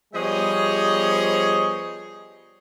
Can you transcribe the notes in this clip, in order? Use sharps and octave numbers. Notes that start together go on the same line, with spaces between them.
F3 G3 B3 G#4 C#5 D#5